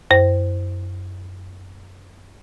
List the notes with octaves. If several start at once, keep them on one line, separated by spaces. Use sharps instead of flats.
F#2 C5